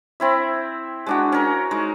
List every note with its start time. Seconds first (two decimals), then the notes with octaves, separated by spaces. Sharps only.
0.20 C4 E4 E5
1.06 G#3 D4 F#4
1.32 C#4 A#4
1.71 G#3 D#4